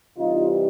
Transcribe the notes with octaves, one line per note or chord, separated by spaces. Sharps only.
C3 E3 G3 D#4 F4